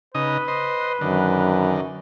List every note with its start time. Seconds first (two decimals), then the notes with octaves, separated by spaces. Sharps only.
0.15 C#3 D#4 B4 D#5
0.48 C5 D#5
1.01 F#2 D3 D#3